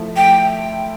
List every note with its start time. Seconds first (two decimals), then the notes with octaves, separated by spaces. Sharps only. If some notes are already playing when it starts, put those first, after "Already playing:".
Already playing: F3 A3 E4
0.17 G5